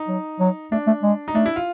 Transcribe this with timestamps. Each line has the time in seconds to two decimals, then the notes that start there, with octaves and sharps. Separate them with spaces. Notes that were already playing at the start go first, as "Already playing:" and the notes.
Already playing: D#4
0.08 F#3
0.40 F#3
0.72 A3 D4
0.87 A3
1.03 G#3
1.28 D#4
1.35 A3 D4
1.46 E4
1.56 F4